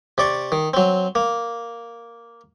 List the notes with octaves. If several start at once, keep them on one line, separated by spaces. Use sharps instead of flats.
C3 D5 C#6
D#3
F#3 C4
A#3